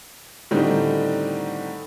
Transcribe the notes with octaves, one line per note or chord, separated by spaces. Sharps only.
A2 D3 D#3 G3 C4 D#4